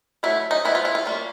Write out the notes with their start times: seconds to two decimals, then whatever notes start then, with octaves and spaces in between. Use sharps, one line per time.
0.23 F#3 A3 C#4 E4
0.51 D#4
0.65 F3 G#3 B3 E4
0.75 F4
0.85 E4
0.95 F4
1.06 G3 A#3 C#4